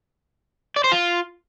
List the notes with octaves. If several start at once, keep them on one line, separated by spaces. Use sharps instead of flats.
D5
C5
F4